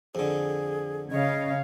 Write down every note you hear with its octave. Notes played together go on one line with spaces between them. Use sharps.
F2 D3 G#4
C#3 C#5 D#5 F5